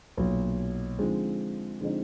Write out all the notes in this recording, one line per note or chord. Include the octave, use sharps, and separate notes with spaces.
B1 A#2 F#3
D3 F3 G#3 C4 D#4
D3 F3 G#3 C4 D#4